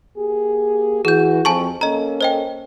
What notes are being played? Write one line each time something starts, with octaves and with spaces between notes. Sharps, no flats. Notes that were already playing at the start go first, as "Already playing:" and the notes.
A#3 G4 G#4
E3 F#4 G#4 G6
F2 G#5 A5 C#6
A#3 C#4 A4 D#5 A#5
C5 D#5 G5